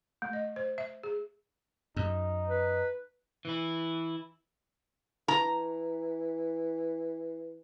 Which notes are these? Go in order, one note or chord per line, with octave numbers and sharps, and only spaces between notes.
A3
D#5
C5
E5
G#4
F#2 D#4
B4
E3 E4
E3 A#5